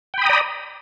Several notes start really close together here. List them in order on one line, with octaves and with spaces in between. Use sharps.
G5 B5 D#6 A#5 D5